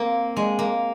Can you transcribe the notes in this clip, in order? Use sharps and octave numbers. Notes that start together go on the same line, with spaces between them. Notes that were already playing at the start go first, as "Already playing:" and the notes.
Already playing: A#3 C4
G#3
A#3